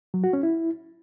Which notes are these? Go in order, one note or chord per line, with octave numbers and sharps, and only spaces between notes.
F#3
F#4
C#4
E4